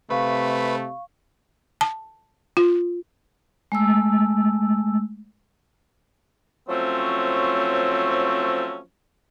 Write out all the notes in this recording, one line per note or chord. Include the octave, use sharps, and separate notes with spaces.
C3 A3 B4 F5 C#6
A5
F4
G#3 A3 E6
F3 F#3 A3 C4 C#4